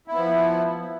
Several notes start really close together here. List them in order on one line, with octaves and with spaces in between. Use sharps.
E4 B3 F3